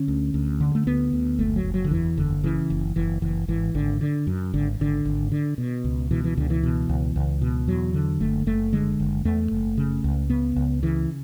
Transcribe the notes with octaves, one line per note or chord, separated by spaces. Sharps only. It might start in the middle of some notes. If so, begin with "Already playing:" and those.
Already playing: D3 C#4
D2
D2
D3
A3
D2 B3
D2
F#1 A3
F#3
F#1
F#3
D3
E2 E3
F#1 D3
C#3 E3
F#1
F#1 E3
F#1 E3
G#1 E3
G#1 D3
D3
F#2
G#1 D3
G#1 D3
G#1
D3
B2
C#2
B2 E3
E3
C#2 D3
E3
B2
C#2
C#2
B2
E2 F#3
D3
F#1 A3
F#1 A3
D3 G#3
F#1
E2 A3
F#1
C#3
C#2
C#3 B3
C#2
C#3 E3